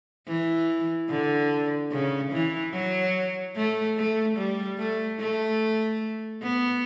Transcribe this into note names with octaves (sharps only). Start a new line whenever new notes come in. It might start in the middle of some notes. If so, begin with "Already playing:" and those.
E3
D3
C#3
E3
F#3
A3
A3
G3
A3
A3
B3